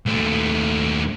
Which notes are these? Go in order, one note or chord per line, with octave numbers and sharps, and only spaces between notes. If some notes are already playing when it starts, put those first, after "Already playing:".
D#2 A3